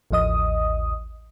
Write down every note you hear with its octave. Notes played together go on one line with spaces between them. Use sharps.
A1 D#2 F3 D#5 D#6